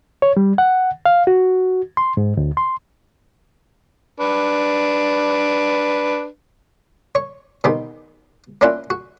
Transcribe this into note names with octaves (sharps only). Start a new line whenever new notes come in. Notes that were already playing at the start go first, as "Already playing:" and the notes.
C#5
G3
F#5
F5
F#4
C6
G#2
D2
C6
D4 B4
C#5 C#6
B2 D#3 B3 C4 D#4 G4
A#3 C#4 D4 E4 F4 F#5
F#4